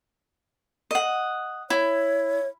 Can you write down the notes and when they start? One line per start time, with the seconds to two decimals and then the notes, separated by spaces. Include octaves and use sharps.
0.91 D#5 F#5
1.70 E4 C#5